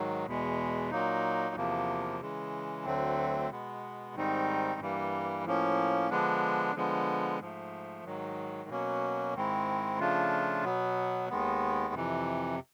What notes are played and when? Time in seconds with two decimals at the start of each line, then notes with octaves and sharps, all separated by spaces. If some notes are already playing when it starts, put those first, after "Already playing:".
Already playing: G#2 D#3 F#3
0.26 E2 B2 G#3
0.91 A#2 F#3 A#3 D#4
1.55 E2 C3 F3 A#3
2.21 C#3 E3 G#3
2.85 D2 D3 F#3 A3 C4
3.51 B2 G#3 B3
4.15 G#2 D#3 G3 C4 D#4
4.80 G2 E3 G3 A#3
5.45 A2 F3 A#3 C#4
6.10 D3 F3 G#3 B3 D4
6.75 D3 F3 G#3 B3
7.40 G#2 F3 A3
8.05 G#2 D#3 F#3
8.69 B2 F#3 A#3 C#4
9.34 G#2 D#3 G#3 C4 E4
9.99 C#3 F3 A3 D4 F4
10.64 B2 F#3 B3
11.30 D#2 D#3 G#3 B3
11.94 F2 C3 E3